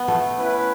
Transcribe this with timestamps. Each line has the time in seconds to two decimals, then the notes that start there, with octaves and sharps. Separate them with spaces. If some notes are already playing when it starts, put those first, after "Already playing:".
Already playing: B3
0.08 A3
0.38 C#4 E4 B4